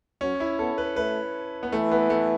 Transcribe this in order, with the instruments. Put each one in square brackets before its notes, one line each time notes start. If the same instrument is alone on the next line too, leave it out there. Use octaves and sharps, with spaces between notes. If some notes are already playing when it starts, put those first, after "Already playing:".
[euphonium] F#3 [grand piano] C#4
[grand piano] E4
[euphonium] B3 [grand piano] A4
[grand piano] B4
[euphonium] A3 [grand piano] B4
[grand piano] B3
[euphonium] E3 [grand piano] A3
[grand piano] B3
A3